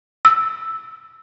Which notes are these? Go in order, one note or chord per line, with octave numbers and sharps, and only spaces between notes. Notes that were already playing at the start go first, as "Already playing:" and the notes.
E6